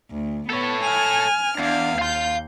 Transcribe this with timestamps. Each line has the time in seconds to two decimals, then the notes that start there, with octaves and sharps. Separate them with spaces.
0.12 D2
0.50 B3 A4 C#5
0.83 G#5 F6
1.58 E2 D4 F5
1.99 D#2 F5 C6 G6